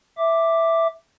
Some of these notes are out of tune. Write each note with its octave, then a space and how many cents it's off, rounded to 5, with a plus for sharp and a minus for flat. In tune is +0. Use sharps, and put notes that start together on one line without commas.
E5 +0 D6 +0